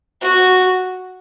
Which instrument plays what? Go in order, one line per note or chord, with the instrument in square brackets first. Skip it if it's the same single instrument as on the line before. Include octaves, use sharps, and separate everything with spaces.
[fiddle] F#4